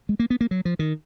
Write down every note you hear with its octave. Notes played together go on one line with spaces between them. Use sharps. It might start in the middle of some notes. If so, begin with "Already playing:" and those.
G#3
A#3
B3
A#3
F#3
F3
D#3